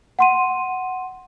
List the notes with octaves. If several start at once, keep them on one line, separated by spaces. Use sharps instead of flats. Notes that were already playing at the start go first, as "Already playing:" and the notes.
F#5 C6 D#7